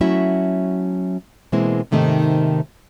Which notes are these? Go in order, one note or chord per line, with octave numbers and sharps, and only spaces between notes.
F#3 A3 C#4 E4 F#4 E5
B2 E3 G#3 A#3 C4 E4
G#2 C3 D#3 A3 A#3 D#4